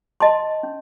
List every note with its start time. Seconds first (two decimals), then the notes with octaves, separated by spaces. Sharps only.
0.20 D#5 A5 C6
0.63 C#4